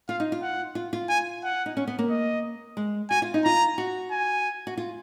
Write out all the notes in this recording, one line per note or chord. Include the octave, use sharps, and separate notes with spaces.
F4 F5
D#4
F4
F#5
F4
F4
G#5
F#5
D#4
C#4
B3
A#3
D#5
G#3
F#4 G#5
F4
D#4
F4 A#5
F#4
G#5
F#4
F4